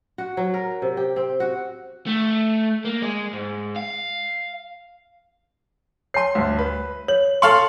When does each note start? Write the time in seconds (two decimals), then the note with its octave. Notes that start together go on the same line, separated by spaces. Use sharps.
0.18 F#4
0.37 F#3
0.54 A#4
0.82 C3
0.97 G4
1.16 C4
1.40 F#4
2.07 A3
2.85 A#3
3.02 G#3
3.33 G#2
3.76 F5
6.14 C#5 A5 C6 C7
6.35 D2 G2
6.59 B4
7.08 C#5 F#7
7.42 A4 F5 C6 C#6 F#7